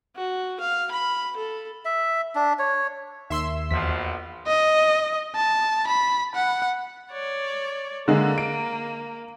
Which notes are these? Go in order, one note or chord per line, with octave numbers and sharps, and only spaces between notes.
F#4
F5
B5
A4
E5
D4
C#5
D#2 E5 C6 E6
A#1 E2 B2 F3 B6
D#5
A5
B5
F#5
C#5 D5
D3 G#3 A#3
D7